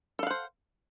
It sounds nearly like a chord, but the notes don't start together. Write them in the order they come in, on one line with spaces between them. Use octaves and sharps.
A4 F5 F#5 C5